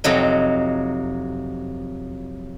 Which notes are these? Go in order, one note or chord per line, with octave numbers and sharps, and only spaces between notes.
F2 C3 F#3 D#4